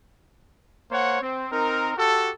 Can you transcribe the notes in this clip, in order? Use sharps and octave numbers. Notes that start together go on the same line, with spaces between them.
A#3 C5 C#5 F#5
C4
C4 D#4 A#4
F#4 G4 A4